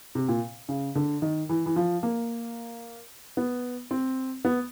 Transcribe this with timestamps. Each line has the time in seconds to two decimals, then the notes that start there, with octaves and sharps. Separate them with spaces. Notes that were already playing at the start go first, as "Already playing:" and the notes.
0.15 C3
0.29 A#2
0.69 C#3
0.95 D3
1.22 D#3
1.49 E3
1.66 E3
1.76 F3
2.03 A#3
3.37 B3
3.91 C4
4.45 B3